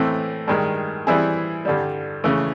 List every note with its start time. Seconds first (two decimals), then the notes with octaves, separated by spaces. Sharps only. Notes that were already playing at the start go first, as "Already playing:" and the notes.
Already playing: A2 E3 A3 C4
0.48 G2 D#3 G#3
1.07 E3 G3 C4 E4 G#4
1.65 G2 D3 G3
2.24 C#3 E3 A3